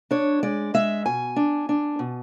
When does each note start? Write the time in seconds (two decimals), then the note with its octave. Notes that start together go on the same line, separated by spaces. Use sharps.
0.11 D4 C#5
0.43 G#3 D5
0.74 G#3 E5
1.06 B2 G#5
1.36 D4
1.69 D4
1.99 B2